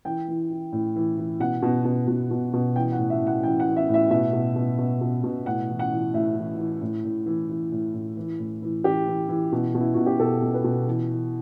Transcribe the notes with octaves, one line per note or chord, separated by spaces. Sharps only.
E3 G5
E3
E3
A2
E3
E3
B2 F#5
B2
B2
B2
B2
B2
E3 G5
F#5
A2
E5
A2
F#5
E3 G5
F#5
E3
E5
A2
E5
B2 E5
B2
B2
B2
B2
B2
A2 F#5
E3
F#5
E3
A2 E5
E3
E3
A2
A2
E3
E3
A2
A2
E3
A2
E3
E3 G4
E3
E3
B2
B2
E4
B2 F#4
G4
B2 A4
B2
B4
B2
E3
E3